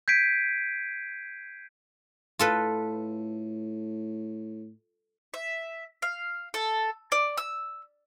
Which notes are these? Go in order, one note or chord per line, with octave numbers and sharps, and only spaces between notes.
G6 G#6 B6 C7 D7 D#7
A2 F4 A4 B4
E5
F5
A4
D5
E6